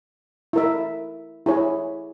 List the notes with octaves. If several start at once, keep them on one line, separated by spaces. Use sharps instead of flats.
E4 A#4 E5
E4 G#4 C#5